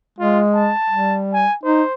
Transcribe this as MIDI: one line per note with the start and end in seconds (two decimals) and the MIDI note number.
0.19 0.70 56
0.19 0.42 65
0.54 1.18 81
0.90 1.45 55
1.33 1.56 80
1.63 1.83 63
1.63 1.94 72